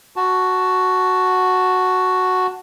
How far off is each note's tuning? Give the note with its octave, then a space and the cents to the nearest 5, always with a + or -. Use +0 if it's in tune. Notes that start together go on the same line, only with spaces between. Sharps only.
F#4 +0 A5 +0